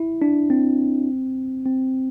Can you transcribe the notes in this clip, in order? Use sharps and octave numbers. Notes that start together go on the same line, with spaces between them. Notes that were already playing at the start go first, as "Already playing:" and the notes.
Already playing: E4
D4
C4
C4